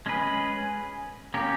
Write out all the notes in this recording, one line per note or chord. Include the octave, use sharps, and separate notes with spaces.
G#3 C#4 G#4 B4
A#3 C#4 G4